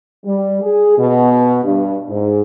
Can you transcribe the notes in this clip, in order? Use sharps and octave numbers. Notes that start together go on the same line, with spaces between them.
G3
G#4
B2
G2
G#2